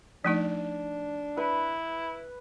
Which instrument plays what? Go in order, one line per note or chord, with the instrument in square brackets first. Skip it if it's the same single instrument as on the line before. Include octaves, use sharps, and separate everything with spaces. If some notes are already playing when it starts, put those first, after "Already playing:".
[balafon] F3 A3 D#4 [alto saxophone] D4
[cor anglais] E4 [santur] B4